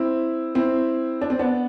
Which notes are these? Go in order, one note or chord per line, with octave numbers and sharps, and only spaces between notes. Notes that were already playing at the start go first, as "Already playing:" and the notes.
Already playing: C4 E4
C4 E4
D4
C4
B3 D4